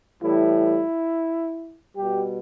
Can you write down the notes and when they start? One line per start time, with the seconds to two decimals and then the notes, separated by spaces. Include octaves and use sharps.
0.22 A2 E3 G3 E4
1.96 B2 G3 G4